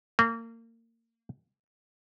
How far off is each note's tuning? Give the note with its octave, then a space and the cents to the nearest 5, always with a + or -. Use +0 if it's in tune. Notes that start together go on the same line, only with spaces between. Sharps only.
A#3 -30